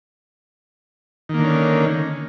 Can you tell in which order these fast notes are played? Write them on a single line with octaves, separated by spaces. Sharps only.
D#3 A#3 D3 C#4